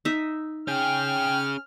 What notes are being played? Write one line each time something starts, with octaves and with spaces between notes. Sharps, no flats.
D#4 E5
C#4 G#4 G5 F6